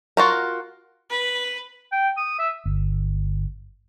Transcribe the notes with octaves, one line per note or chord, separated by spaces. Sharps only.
F4 F#4 A#4
B4
G5
D#6
E5
G1